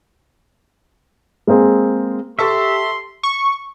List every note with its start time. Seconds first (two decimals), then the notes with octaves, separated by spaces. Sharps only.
1.47 G#3 A#3 C4 G#4
2.39 G4 A4 E5 A5 C6 C#6
3.23 C#6